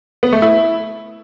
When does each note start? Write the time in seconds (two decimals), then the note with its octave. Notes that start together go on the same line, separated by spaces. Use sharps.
0.23 B3
0.33 A3
0.42 E4